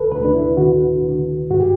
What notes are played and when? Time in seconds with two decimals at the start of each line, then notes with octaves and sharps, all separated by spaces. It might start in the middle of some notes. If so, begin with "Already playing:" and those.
Already playing: D2 A4 B4
0.12 D2 B4
0.25 D4
0.34 E4
0.57 D3 F#4
1.04 D3
1.50 G2 F#4
1.60 G4